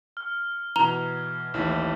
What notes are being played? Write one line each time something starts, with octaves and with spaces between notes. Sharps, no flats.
F6
B2 E3 A#5 F7 G7
A1 D#2 E4